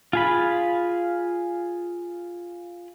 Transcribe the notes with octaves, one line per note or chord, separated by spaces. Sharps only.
F4 G#4 B5